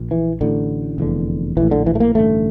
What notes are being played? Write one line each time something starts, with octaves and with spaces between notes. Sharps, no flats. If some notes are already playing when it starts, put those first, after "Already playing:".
Already playing: A#1 A#2
E3
A1 A2 D3
F1 E2 D3
A#1 A2 E3
D3
E3
A3
A#3
A1 G2 D3 A3